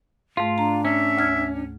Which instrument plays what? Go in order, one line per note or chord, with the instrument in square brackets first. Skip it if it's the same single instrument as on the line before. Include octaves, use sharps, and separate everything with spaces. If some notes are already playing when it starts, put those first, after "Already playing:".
[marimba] G#2 A3 [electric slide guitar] F4
[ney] D4 [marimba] A#5
[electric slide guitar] C#4 [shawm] E5
[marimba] D2 F6 G#6